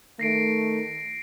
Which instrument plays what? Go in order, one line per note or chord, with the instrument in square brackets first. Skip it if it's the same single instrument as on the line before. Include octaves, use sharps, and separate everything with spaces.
[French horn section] D#3 A3 [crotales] A#6 C7 D7